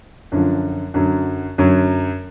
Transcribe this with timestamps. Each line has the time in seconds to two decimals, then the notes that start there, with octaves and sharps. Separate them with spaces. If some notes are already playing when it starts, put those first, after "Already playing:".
0.32 F#2 D3 F3
0.94 F#2 D3 F#3
1.58 F#2 D3 F#3